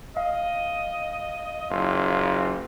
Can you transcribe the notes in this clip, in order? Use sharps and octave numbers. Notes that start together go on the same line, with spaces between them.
D#5 F5
F#1 F4